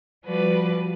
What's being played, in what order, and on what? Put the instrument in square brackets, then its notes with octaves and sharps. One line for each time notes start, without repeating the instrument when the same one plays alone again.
[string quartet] F3 G3 F#4 B4 D5